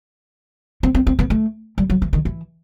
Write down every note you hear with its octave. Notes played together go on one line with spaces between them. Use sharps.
C4
C4
C4
B3
A3
G3
F#3
E3
D#3
E3